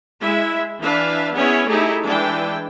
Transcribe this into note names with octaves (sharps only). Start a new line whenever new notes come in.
G#3 E4 E5
E3 D4 B4 E5 F5
B3 C#4 E4 G#4 C#5
A3 D#4 E4 G4 G#4
E3 G#3 D4 G5